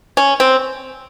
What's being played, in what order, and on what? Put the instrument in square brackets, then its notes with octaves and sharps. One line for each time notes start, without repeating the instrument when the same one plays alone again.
[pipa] C#4
C4